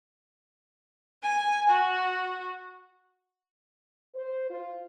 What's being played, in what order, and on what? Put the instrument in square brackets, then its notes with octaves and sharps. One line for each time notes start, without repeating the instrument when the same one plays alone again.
[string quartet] G#5
F#4
[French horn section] C5
F4